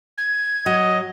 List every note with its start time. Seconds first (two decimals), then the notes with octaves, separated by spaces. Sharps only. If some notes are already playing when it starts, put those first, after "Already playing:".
0.18 G#6
0.66 F#3 D#5